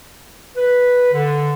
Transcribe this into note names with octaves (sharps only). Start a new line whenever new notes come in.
B4
D3